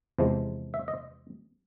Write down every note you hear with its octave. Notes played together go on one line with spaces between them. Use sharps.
E2 C3 F3 G#3
E5
D#5